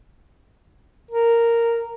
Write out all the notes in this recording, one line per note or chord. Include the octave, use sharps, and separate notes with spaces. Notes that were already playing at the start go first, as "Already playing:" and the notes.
A#4